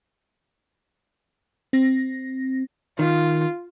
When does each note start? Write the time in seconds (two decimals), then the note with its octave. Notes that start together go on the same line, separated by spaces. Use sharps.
1.73 C4 A#6
2.99 D#3 F4